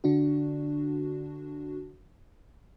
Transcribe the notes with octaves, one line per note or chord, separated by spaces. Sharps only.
D3 D4 F#4